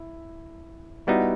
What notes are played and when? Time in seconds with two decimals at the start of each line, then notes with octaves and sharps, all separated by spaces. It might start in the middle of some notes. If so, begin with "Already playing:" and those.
Already playing: E4
1.07 G3 B3 D#4 E4 F#4